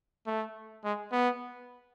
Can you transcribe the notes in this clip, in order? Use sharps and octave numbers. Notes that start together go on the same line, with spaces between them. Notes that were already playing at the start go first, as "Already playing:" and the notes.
A3
G#3
B3